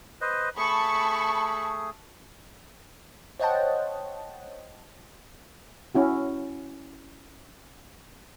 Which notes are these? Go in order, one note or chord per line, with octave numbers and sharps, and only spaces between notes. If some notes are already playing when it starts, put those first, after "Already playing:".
B4 C5 D#5
A3 G#4 A5 B5 C#6
C5 C#5 D#5 F#5 G5 A5
C#4 E4 F#4